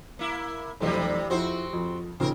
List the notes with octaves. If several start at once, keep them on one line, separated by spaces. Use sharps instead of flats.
A#3 E4
F1 B1 C3 E3 G3 C4
F2 C4 E4 F#4 C5
F2
D#2 A#2 C#3 C4 A#4